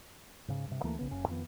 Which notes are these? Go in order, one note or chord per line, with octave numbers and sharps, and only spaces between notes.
G#2 C#3
G2 C3
D2 E3 A3 A#3
A#1 C#3 B3
F#1 F#2 C#4
F2 D#3 F3 B3